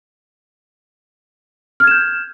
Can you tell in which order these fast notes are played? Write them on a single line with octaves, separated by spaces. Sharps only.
F6 G#6 E7 G6